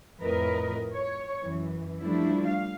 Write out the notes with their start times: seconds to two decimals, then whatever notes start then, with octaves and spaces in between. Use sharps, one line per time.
0.21 F2 A2 A#4 B4 D#5
0.95 C#5
1.42 F#2 E3
2.01 F3 G3 A3 D4 E4
2.47 F5